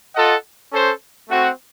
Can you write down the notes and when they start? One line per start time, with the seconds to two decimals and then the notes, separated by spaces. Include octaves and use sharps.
0.15 F4 A4 D#5 F#5
0.72 C#4 A4 C5
1.29 A3 C4 F#4